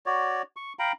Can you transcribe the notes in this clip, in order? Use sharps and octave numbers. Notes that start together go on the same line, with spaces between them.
F#4 C#5 D5
C#6
F5 G5 A#5 B5